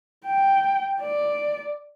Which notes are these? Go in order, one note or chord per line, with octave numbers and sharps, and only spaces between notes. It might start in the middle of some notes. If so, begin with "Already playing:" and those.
G5
D5